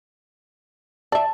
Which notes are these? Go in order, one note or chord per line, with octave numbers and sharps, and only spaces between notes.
D5 E5 A5